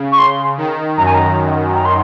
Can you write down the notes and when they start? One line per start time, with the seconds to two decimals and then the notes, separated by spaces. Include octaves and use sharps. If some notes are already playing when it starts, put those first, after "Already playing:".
Already playing: C#3
0.12 C#6
0.19 C6
0.58 D#3
0.97 F#2 A#5
1.06 G#5
1.14 A#5
1.75 A#5
1.85 C6